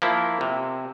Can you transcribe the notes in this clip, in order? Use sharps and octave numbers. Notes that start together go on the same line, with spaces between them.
F3 A#3 E4
C3